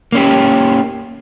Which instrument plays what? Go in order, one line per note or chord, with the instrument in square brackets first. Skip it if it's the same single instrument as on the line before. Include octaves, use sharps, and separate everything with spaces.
[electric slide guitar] A#3 C#4 G4